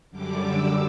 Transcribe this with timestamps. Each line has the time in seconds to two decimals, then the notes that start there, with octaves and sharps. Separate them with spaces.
0.11 F#2 D3 G3 D6
0.44 E6